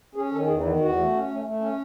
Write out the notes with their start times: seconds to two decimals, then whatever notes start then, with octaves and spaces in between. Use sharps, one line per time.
0.15 C#4 G#4
0.32 D#3 A4
0.47 E2 G#4
0.59 D#4
0.63 D#3 E4
0.80 E2 F#4
0.96 A3
1.12 C#4
1.28 A3
1.45 A3
1.60 C#4